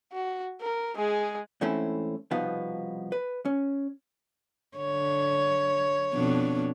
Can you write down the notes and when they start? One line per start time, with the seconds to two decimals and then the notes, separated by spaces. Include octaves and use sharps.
0.13 F#4
0.61 A#4
0.96 G#3 G#4
1.61 G#2 E3 A3 C4 C#4 E4
2.31 C2 B2 F3 B3 D#4 F5
3.12 B4
3.45 C#4
4.77 D3 C#5
6.14 F2 B2 D4